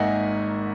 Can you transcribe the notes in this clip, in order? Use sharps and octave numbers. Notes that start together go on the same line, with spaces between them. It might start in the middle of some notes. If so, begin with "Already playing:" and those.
Already playing: G#1 G#2 D#3 A#3 D#5 E5 F#5 G#5